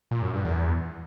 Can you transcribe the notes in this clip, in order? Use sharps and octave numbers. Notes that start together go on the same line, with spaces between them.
A#2
F#2
G2
E2